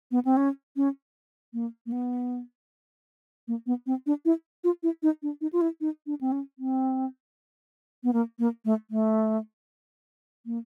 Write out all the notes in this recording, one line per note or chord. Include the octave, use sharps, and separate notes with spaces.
B3
C4
C#4
C#4
A#3
A#3
B3
A#3
B3
C4
D4
E4
F4
E4
D#4
D4
D#4
F4
E4
D#4
D4
C4
C#4
C4
B3
A#3
A#3
A3
A3
A#3